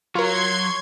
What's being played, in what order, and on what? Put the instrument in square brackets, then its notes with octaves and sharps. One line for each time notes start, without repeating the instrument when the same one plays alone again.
[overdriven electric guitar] F#3 [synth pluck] F4 A#4 [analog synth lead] C#5 [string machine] C6 G#6